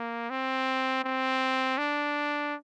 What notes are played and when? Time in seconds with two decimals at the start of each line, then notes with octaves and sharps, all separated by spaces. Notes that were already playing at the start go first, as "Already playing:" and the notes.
Already playing: A#3
0.30 C4
1.04 C4
1.78 D4